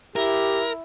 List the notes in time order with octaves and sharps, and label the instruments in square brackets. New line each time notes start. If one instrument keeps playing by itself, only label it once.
[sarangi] E4 [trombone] G4 [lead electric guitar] A#4